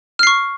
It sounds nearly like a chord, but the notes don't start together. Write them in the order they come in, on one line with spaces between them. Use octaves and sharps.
F6 C7 C#6